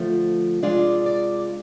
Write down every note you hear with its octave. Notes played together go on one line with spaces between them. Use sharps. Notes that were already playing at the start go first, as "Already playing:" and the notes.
Already playing: D3 F3 A3
C3 G#3 D4 F4 D5
D5